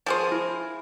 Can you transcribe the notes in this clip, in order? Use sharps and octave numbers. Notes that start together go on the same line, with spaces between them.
F3 G#4 C5
E4